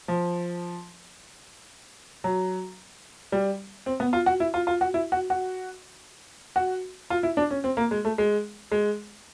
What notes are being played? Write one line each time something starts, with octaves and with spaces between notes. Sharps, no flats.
F3
F#3
G3
C4
B3
F4
F#4
E4
F4
F4
F#4
E4
F#4
F#4
F#4
F4
E4
D4
C#4
C4
A#3
G#3
A3
G#3
G#3